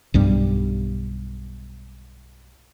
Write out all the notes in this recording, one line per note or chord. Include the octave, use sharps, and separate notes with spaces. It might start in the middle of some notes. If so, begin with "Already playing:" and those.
B1 G2 G3